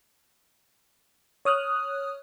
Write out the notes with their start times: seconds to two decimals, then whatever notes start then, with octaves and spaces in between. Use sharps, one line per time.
1.45 C#5 D#6 F6 F#6